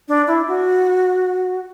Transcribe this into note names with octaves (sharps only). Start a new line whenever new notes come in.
D4
E4
F#4